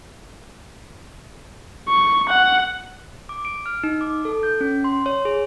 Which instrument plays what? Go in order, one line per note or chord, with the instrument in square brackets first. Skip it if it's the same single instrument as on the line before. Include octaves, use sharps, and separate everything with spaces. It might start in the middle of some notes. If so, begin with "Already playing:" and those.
[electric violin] C#6
F#5
[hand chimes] D6
D7
F6
D#4
D6
A4
G6
C#4
C6
C#5
G#4